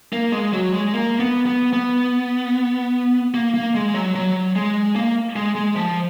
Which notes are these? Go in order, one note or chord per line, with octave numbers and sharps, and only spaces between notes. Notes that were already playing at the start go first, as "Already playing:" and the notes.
A#3
G#3
F#3
G#3
A#3
B3
B3
B3
A#3
A#3
G#3
F#3
F#3
G#3
A#3
G#3
G#3
F3